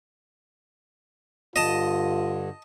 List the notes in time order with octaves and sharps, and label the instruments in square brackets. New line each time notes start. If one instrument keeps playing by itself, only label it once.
[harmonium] G2 D3 [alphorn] F4 [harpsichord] D#5 A5